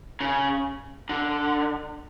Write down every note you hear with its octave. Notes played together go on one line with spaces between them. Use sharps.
C#3
D3